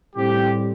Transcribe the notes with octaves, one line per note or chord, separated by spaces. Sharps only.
A2 G3 C4 G4